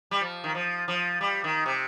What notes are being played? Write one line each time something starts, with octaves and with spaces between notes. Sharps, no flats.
G3
F3
D#3
F3
F3
G3
D#3
C3